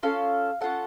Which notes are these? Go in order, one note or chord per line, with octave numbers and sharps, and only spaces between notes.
C#4 F4 A4 F5
C#4 F4 A4 F#5